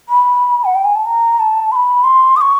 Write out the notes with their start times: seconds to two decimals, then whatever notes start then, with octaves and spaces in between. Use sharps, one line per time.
0.09 B5
0.64 F#5
0.75 G5
0.85 G#5
0.95 A5
1.06 A#5
1.39 A5
1.72 C6
1.76 B5
2.04 C6
2.36 D#6
2.41 C#6